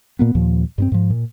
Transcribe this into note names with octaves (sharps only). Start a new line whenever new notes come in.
A#2 A#3 B3
D#2 A#2 F3
G2 B3 C4
G#2 F3
A#2